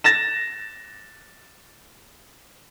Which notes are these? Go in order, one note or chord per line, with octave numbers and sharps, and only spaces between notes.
A6 A#6 E7